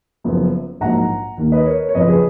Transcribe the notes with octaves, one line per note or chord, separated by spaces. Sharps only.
F#1 F#2 F3 B3
A#1 G#2 F#3 A#3 F#5 A#5
D#2 D#3 A#3
B4 D#5
A#4 C#5
C#5
F#1 F2 F3 B4 D#5
G#4 B4